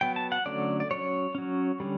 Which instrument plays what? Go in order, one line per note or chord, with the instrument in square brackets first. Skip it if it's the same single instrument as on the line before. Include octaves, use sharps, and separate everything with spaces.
[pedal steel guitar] F#3 B3 G5
A5
F#5
D3 F#3 A3 C#4 D5
D5
F#3 C#4 C#5
F#3 C#4
D3 G3 C#4